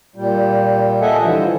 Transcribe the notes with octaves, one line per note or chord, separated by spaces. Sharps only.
A#2 G3
A4 D#5 E5 F#5 G#5
D3 E3 F3 G3 G#3